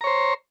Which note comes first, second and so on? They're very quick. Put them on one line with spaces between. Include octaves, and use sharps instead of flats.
A#5 C#5 C5